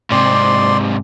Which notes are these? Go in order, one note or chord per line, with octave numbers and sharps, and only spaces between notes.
G#2 C3 D5 C6